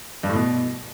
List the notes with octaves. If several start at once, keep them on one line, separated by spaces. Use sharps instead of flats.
G2
A2
B2